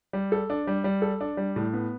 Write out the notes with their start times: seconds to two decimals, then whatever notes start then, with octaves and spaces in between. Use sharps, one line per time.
0.13 G3
0.32 A4
0.50 D4
0.67 G3
0.84 G3
1.02 A4
1.21 D4
1.37 G3
1.56 A2
1.73 B3